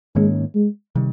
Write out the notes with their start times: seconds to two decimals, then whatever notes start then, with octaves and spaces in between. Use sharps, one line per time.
0.15 G#2 D#3 G#3 A#3 C#4
0.55 G#3
0.96 C3 D#3 G3